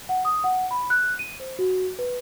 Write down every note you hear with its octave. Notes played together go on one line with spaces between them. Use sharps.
F#5
D#6
F#5
B5
F#6
D#7
C5
F#4
B4